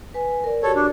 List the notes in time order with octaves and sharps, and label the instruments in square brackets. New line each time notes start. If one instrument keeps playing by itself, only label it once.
[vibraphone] B4 G#5
A#4 D5
[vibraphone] F#4 G4 [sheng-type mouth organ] A4 C#5
[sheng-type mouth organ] D4